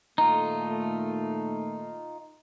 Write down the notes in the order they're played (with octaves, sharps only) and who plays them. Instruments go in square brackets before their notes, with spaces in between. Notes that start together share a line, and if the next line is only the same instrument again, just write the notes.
[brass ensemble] A#2 D#3 A3 [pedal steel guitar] D#4 F4 [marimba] A#5